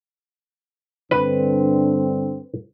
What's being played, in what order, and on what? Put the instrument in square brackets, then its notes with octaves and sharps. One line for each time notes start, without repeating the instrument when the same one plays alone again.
[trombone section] G2 D3 C4 [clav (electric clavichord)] B4